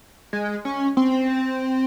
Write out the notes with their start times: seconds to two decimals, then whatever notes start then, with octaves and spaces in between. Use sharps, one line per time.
0.33 G#3
0.65 C#4
0.97 C4